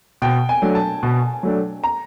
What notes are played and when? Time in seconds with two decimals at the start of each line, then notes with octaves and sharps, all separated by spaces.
0.22 B2 G5
0.49 G#5
0.62 F#3 A3 D4
0.75 A5
1.03 B2
1.43 F#3 A3 D4
1.84 A#5